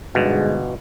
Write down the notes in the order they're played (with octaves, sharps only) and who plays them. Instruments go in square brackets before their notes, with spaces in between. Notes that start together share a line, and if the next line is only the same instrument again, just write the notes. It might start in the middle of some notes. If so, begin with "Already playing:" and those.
[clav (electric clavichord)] G1 B2 [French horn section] G#2 D3 G#3